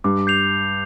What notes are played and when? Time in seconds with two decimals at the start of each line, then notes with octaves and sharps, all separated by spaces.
0.04 G2 D6
0.27 G6 C7 F7